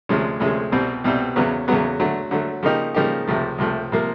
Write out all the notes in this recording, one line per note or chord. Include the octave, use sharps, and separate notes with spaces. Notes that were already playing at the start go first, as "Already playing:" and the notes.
D2 C3 F3 G#3 C#4
D2 C3 F3 G#3 C#4
C2 B2 G3 C4
C2 B2 G3 C4
E2 C#3 F#3 B3
E2 C#3 F#3 B3
D3 F#3 A3
D3 F#3 A3
C#3 F3 A#3 D#4 G4
C#3 F3 A#3 D#4 G4
C#2 C3 F3 A3
C#2 C3 F3 A3
C3 F3 A#3